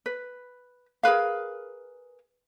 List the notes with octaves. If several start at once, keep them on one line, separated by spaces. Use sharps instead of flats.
B4
G#4 A#4 B4 F5